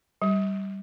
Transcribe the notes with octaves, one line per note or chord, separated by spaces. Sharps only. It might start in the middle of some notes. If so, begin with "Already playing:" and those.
G3